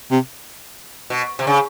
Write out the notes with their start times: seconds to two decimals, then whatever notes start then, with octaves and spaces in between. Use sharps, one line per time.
0.11 C3
1.10 B2
1.39 C3
1.47 C#3